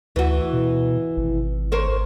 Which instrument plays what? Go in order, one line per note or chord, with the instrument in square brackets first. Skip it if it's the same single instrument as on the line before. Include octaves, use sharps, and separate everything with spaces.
[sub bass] D2 [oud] E3 F#4
[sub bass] B2
G#1
[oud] A#4 C5 C#5